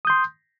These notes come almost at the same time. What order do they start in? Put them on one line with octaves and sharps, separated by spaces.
D#6 G6 C6